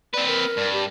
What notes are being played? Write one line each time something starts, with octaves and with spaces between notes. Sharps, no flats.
C4 B4 D5
A#4
G2
G4